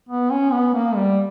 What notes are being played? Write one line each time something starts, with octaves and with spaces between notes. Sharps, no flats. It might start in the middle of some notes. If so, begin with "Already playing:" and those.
B3
C#4
B3
A#3
G3